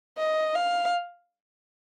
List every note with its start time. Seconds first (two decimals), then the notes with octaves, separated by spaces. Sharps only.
0.18 D#5
0.55 F5